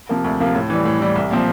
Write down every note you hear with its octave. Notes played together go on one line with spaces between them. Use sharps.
C3 F3 A#3
D2
C3 F3 A#3
A2
E3 G3
A2
E3 G3
C2
A#2 F3 C4